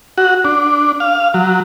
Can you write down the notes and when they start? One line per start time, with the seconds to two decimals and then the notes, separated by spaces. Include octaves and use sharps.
0.18 F#4
0.45 D4
1.00 F5
1.34 F#3